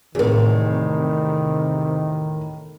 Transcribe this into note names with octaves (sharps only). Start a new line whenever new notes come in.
E2 A2 C3 D#3 G#4 A#4